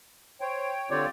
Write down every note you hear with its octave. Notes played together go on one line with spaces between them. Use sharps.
C5 C#5 G5
D3 C4 F4 G4 C#5 D5